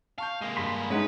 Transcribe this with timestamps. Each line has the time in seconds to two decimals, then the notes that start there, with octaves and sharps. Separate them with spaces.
0.18 F5 A5 C#6 G6
0.42 G#3 A#3
0.57 G2 B5 C6
0.90 G#3 C#4 D#4 E4 B4 F#5